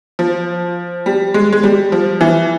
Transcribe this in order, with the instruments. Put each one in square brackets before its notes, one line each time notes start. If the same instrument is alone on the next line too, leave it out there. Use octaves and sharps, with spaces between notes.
[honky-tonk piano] F3
G3
G#3
G#3
G3
F3
E3